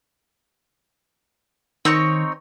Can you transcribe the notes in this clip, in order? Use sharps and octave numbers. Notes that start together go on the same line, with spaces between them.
D#3 C4 D#4 C#5